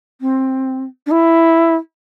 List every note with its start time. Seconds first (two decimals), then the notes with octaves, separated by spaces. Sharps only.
0.21 C4
1.06 D4
1.11 E4